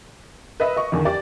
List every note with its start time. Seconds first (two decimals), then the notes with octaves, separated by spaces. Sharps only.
0.60 B4 D#5 E5
0.77 D#5 C#6
0.92 E2 D3 D#3
1.05 G4 D5